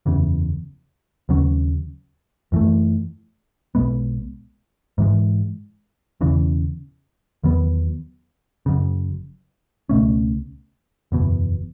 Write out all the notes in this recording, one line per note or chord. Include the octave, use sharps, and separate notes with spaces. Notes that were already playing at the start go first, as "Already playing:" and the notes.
F#1 E2 C#3
D#2 C#3 F#3 C#4
F#2 E3 A3
B1 B2 G#3 B3
G#2 E3 G#3
E1 E2 C#3 E3
E2 D#3 F#3 B3
F#1 F#2 C#3
C#2 B2 A3 C#4
F#1 E2 B2